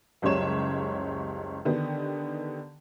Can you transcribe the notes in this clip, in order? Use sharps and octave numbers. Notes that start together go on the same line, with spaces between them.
F#1 C#2 C#3 G3 C#5 E7
D3 D#3 B3 G4